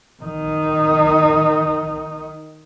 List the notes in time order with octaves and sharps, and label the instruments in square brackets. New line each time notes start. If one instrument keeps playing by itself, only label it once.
[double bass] D#3 D#4